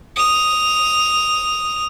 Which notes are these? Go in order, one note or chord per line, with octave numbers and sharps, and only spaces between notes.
D#6 F7